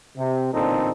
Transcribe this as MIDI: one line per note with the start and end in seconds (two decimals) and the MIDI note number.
0.18 0.50 48
0.53 0.90 33
0.53 0.90 46
0.53 0.90 50
0.53 0.90 60
0.53 0.90 63
0.53 0.90 69